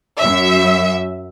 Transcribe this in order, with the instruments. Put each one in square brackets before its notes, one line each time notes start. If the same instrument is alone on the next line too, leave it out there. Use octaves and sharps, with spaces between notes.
[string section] F#2 E5